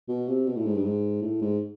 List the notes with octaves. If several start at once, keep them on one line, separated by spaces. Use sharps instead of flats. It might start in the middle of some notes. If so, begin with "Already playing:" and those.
B2
C3
B2
A2
G#2
G2
G#2
A2
G#2